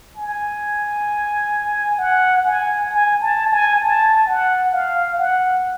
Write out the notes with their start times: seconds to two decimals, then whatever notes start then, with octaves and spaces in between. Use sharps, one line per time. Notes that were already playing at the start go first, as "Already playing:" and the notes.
0.16 G#5
1.99 F#5
2.45 G#5
2.90 G#5
3.21 A5
3.51 G#5
3.82 A5
4.27 F#5
4.73 F5
5.19 F#5